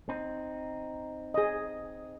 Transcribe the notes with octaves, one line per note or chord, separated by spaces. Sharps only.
C4 D#4
G#4 D#5